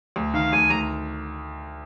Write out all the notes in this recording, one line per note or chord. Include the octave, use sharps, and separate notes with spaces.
D2
D#3 F5
D2 G#5
D2 A#5